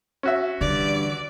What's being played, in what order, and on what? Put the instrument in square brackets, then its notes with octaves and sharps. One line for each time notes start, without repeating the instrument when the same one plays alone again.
[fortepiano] C#4 F#4 E5
[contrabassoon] G2 [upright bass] D3 E3 [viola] D5